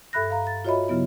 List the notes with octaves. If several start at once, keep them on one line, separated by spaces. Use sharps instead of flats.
G2 A4 E5 B5 F#6 A#6
F5 A#5
A6
F4 F#4 C#5 D#5 E5 B5
C#3 F#3 B3 E4